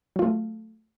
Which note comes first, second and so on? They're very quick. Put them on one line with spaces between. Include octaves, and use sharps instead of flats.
F#3 F4 A3